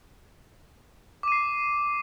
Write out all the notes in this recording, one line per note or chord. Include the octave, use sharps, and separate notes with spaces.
D6 C7 D#7